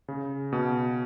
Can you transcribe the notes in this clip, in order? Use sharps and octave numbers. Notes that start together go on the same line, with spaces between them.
C#3
B2